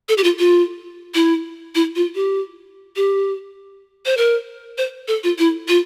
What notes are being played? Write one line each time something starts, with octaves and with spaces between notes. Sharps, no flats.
A4
G4
F4
F4
E4
E4
F4
G4
G4
C5
A#4
C5
A4
F4
E4
F4